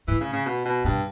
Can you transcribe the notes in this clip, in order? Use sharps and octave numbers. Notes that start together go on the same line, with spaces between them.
A2 E3
C#3
C#3
B2
B2
G2 B2